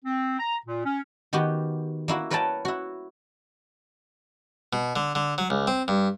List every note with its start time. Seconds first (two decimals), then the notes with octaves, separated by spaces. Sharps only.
0.05 C4
0.40 A#5
0.66 A#2
0.85 C#4
1.33 D#3 B3 F#4 G4
2.08 A#3 E4 F#4
2.30 A#4 B4 C#5 F#5 G5 A5
2.65 E4 F#4
4.73 B2
4.96 D3
5.15 D3
5.38 F#3
5.50 C#2
5.67 C4
5.88 G2